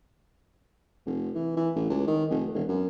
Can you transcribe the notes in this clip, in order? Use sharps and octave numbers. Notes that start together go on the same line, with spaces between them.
F1
E3
E3
A1
C#2
D#3
F1
E1
F#2